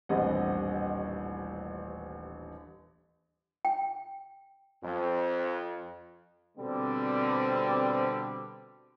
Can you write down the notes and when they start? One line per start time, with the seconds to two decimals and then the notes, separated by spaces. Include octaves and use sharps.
0.09 D#1 A1 G2 C4 D#5 F#5
3.65 G5
4.83 F2
6.58 B2 D3 G3 C4